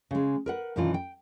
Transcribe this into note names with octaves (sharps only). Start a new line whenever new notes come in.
C#3 G#3
A#4 B4 F#5
F#2 B2 D#3 E3 D4 F4
G5